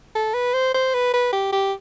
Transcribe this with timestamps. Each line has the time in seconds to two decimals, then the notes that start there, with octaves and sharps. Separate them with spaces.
0.15 A4
0.34 B4
0.54 C5
0.74 C5
0.94 B4
1.13 B4
1.32 G4
1.52 G4